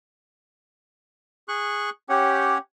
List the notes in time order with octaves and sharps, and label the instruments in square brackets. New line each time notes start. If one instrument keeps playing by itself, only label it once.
[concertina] G#4 C#6 F#6
[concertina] C#4 C#5 F#5 [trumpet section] G4